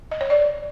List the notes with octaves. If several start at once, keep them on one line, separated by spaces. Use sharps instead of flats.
D#5
C#5
D5